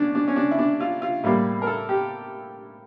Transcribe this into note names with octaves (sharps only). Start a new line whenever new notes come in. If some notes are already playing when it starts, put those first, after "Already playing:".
Already playing: C#2 C#4 D4
D4
C#4
D4
E4
D4
F4
F4
A2 G3 A#3 E4
A#4
A4
G4